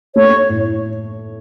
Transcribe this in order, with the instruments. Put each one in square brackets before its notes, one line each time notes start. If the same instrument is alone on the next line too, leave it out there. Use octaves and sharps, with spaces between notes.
[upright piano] A3 [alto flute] C#5
[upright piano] A2